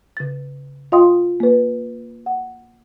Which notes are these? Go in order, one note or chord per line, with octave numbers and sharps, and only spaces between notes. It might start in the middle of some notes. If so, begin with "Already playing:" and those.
C#3 A6
F4 D#5 F5 G5 C6 D#6
A#3 B4
F#5